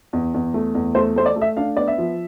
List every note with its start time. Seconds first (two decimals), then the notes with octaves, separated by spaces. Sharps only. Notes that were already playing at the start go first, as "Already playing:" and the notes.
0.13 E2
0.34 E2
0.54 A3
0.75 E2
0.95 A3 C5
1.16 A3 C5
1.26 D5
1.36 A3
1.42 E5
1.57 D4 F5
1.77 B3 D5
1.88 E5
1.98 F3